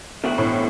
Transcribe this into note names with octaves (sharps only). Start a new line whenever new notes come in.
E2 D3 A3 C4 F#4
A2